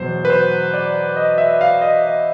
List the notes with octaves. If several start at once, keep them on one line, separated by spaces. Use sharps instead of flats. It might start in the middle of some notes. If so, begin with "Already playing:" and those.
Already playing: E2 B2 F#3 C5
B4
C5
D5
D#5
E5
F5
D#5
D#5